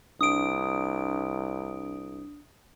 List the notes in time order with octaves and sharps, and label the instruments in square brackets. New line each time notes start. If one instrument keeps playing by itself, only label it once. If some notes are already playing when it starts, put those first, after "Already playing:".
[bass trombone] C2 [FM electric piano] D4 [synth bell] D#6 D7